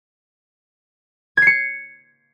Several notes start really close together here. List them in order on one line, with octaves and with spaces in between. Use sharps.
G#6 C7 C#7